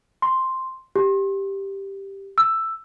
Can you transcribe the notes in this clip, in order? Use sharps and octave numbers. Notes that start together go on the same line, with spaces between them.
C6
G4
E6